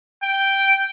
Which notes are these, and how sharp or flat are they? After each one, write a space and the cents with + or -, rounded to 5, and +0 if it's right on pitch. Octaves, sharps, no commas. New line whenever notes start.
G5 -5